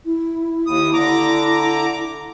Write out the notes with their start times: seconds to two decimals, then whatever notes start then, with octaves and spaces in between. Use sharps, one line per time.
0.05 E4
0.67 D#2 D#6
0.94 D3 A#5 D6